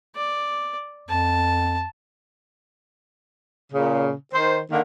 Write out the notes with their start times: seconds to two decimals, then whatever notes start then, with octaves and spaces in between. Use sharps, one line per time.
0.16 D5
1.09 F2 A5
3.72 A#2 C#3
4.33 D#3 C5
4.70 D3 D#3 A#3